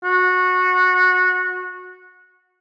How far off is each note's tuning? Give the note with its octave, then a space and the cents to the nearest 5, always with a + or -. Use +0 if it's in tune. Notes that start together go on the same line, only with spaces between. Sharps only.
F#4 -20